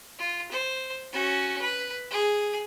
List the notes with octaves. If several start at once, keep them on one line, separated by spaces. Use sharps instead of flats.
F4
C5
C#4 F#4
B4
G#4